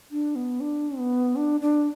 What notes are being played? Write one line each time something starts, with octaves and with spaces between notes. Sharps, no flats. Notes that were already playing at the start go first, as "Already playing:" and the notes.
D4
B3
D4
B3
D4
D4